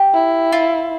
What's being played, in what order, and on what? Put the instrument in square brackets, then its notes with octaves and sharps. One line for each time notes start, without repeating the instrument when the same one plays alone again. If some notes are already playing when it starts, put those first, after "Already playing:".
Already playing: [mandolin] G4
[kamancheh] E4
[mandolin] F4